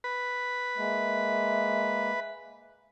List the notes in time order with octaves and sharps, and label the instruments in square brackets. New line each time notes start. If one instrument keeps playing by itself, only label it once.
[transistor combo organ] B4
[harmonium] G#3 A#3 [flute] E5